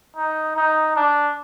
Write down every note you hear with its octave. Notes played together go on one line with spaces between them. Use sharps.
D#4
D#4
D4